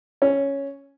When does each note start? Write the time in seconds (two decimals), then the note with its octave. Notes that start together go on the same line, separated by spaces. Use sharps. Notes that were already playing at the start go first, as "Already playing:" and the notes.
0.22 C#4